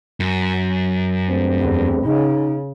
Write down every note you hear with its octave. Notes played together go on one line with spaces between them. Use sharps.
F#2
G2 A3 C4
E2
C#3 D#4